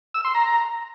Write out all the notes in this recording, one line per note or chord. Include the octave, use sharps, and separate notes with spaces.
E6
C6
A#5